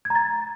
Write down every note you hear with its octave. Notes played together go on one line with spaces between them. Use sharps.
G#6
A#5
A6